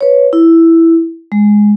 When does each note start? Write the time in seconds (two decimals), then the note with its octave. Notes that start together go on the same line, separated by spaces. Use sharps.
0.01 B4 C#5
0.33 E4
1.32 G#3